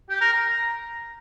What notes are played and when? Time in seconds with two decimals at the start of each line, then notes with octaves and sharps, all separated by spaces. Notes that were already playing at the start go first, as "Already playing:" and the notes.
0.09 G4
0.21 A#4
0.32 A#5